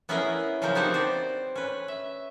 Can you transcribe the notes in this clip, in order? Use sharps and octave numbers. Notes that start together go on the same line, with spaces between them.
B3 C#4 E4 G#4 A#4
C#3 F3 F#3 A#4 G5
B3 C4 D#4 G4 C5 C#5
G4 C5 D5
C#4 B4
E5